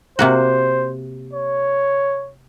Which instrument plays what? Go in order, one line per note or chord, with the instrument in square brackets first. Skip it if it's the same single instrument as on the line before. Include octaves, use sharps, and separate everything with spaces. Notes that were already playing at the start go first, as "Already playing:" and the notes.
[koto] C3 A#3 F#4 [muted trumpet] C5
[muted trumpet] C#5